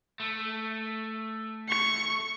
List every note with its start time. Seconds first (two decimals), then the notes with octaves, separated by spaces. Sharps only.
0.20 A3
1.69 C#6